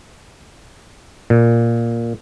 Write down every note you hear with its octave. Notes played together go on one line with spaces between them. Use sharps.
A#2